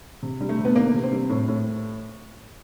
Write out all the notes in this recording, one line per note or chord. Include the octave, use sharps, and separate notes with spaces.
C3
G3
A3
C3
B3
D#3 A#3
C3
C4
G3
A2
A2